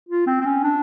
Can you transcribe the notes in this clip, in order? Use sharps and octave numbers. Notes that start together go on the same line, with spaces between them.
F4
C4
C4
C#4
D4